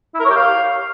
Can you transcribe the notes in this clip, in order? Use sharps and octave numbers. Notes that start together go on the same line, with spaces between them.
E4
A#4
C#5
G4
F5